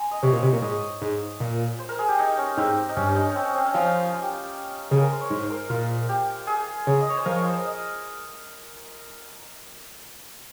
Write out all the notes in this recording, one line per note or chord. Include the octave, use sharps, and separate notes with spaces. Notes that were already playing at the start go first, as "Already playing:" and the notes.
Already playing: G#5 A#5 C6
D#5
C3 C#5
A#2
C3
A#2
G#2 D#5
G#2
A#2
C5
A#4
G#4
G4
D#4
C#4
G#2 C4
D#4
G2 C#4
C#4
D#4
C#4
C4
C#4
C4
C#4
F3 D#4
F4
G4
F4
C#3 G#4
A#4
C5
C#5
G#2 C5
C5
A#4
A#2 F4
G4
G#4
C#3
D#5
C#5
C5
F3 A#4
C#5
C5
C5
D#5